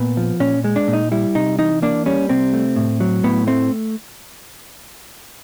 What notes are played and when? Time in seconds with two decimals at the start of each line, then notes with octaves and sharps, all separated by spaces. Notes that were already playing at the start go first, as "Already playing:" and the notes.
Already playing: A#2 B3
0.17 F3
0.40 A#2 C#4
0.64 G#3
0.76 D4
0.88 A#2
0.93 D#4
1.12 G3 E4
1.35 C3 D#4
1.59 E3 D#4
1.82 A#3 D4
2.06 G3 C#4
2.29 C3 C4
2.53 A3
2.76 A2
3.00 F#3
3.24 A2 B3
3.47 A3 C4